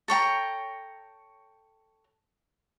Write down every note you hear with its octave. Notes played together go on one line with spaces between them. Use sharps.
A4 C#5 G5 A#5